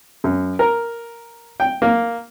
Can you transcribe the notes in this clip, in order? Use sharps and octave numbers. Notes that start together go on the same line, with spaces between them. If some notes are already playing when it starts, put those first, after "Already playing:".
F#2
A#4
G5
A#3